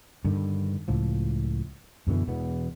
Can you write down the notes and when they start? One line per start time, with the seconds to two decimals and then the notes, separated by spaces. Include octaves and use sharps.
0.25 G2 D3 D#3
0.88 C#2 A2 F3
2.07 F#2 B2 D3 E3
2.28 E1 E2 B2 B3